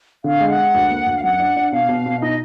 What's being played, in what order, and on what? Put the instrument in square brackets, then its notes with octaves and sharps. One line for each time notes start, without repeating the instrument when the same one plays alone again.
[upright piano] D3 [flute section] F5
[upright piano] G#3
[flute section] F#5
[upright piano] G#3
D2
A#3
D2
[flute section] F5
[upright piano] F#2 [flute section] F#5
[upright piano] D4
D4
[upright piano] B2 [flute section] F5
[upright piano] B2
B2
[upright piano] D#4 [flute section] D#5